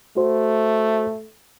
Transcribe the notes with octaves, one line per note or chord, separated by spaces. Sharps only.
A3 F#4 C5